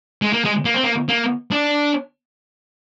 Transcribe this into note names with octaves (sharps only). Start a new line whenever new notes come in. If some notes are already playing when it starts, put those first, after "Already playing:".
G#3
A#3
G#3
A#3
C4
A#3
A#3
D4